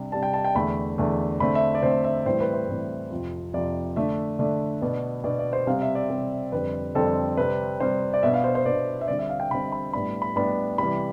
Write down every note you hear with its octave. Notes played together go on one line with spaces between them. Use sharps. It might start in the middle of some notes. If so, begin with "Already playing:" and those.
Already playing: C3 G3 D4
C3 G3 D4 A5
G5
A5
G5
E2 D3 A3 B5
E2 D3 A3
D3 A3 C4 B5
E5
D5
D3 A3 C4 C5
E5
A2 E3 G3 C4 C5
B4
C5
A2 E3 G3 C4
F2 C3 F3
F2 C3 F3 D5
D3 A3 D4 E5
D3 A3 D4
B2 B3 D4
B2 B3 D4 D5
D5
C5
C3 G3 C4 F5
E5
D5
C3 G3 C4
F2 D3 G3 C4 B4
F2 D3 G3 C4 A4
C3 G3 C4 B4
C3 G3 C4 C5
D5
B2 B3 D4 E5
F5
C5
C5
B2 B3 D4 D5
E5
D3 G3 C4 D5
E5
F5
G5
D3 G3 C4 B5
B5
A2 G3 B3 D4 B5
B5
A2 G3 B3 D4 B5
C3 E3 G3 B5